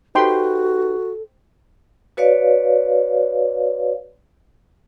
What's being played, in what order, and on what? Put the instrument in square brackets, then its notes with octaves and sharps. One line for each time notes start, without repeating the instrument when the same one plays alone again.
[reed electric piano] D#4 G4 B4 [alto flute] F#4 [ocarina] A4 [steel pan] C5 G5 C6
[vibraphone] F#4 B4 C#5 D5 F5